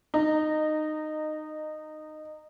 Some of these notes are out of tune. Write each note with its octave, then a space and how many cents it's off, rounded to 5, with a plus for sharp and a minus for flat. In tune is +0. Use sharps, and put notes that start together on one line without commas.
D#4 -15